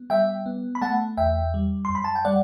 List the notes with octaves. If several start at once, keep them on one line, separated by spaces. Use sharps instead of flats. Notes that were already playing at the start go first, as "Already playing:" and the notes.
Already playing: B3
G3 E5 G5
B3
B5
A3 F#5 A5
E2 E5 G5
G3
F#2 C6
B5
A5
G5
G3 D5 F#5